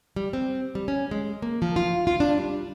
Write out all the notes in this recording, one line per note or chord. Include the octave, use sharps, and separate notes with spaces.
G3
C4
G3
C#4
G#3
A#3
F3
F4
F4
D4
G3